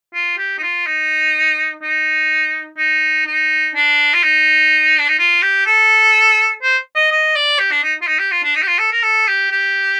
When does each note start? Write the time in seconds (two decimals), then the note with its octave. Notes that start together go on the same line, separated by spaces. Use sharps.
0.14 F4
0.38 G4
0.58 D#4
0.62 F4
0.86 D#4
1.82 D#4
2.78 D#4
3.26 D#4
3.75 D4
4.14 F4
4.23 D#4
4.99 D4
5.08 D#4
5.19 F4
5.42 G4
5.66 A4
6.62 C5
6.95 D#5
7.11 D#5
7.35 D5
7.59 G4
7.71 D4
7.83 D#4
8.02 F4
8.07 D#4
8.19 G4
8.32 F4
8.43 D4
8.55 D#4
8.62 G4
8.67 F4
8.78 A4
8.92 A#4
9.03 A4
9.28 G4
9.51 G4